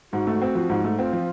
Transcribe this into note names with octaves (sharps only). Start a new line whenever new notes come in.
G#2 F#4
A3
C4
F3
G#2
A3
C4 F4
F3